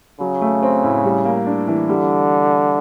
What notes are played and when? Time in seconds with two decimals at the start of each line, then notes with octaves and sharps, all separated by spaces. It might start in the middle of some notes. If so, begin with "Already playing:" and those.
0.20 C#3 F#3
0.42 A3
0.63 C4
0.83 A2
1.05 G3
1.25 A#3
1.46 D4
1.68 E3
1.88 D3 G3